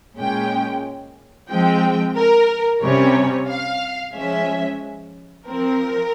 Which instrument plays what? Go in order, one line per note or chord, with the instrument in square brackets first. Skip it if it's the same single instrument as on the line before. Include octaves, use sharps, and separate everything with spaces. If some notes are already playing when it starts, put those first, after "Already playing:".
[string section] A#2 G#3 C#4 G5
F3 G#3 C4 G5
A#4
C3 G3 C#4 C#5
F5
F3 G#3 C#4 E5
F3 C4 A#4